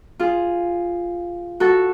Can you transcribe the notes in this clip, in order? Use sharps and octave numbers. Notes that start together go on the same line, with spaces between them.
F4 G#4
F#4 A4